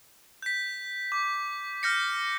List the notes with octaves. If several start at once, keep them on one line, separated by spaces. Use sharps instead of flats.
G6 B6
D6
F6 G6 A#6 C#7